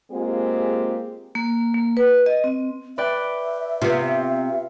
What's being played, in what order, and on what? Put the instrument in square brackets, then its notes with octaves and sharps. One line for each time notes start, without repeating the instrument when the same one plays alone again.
[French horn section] G#3 A#3 C4 F4 G4 G#4
[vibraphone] A#3
A#3
B4
D#5
C4
[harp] B4 D5 G5 [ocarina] E5
[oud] C3 B3 [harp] F4